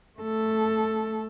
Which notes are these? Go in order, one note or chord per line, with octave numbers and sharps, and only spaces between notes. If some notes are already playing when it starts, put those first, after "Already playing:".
A3 A4